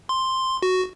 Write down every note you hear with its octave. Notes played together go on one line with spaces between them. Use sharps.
C6
F#4